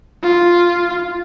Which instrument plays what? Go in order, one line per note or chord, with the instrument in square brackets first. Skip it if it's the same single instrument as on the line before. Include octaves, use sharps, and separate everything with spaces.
[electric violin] F4